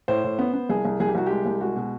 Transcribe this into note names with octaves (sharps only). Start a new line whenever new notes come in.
A2 C5
A2
B3
B3
C2 G#4
C2
C2 G#4
G4
C2 F#4
G#3 G4
C2
G#3 F#4
B2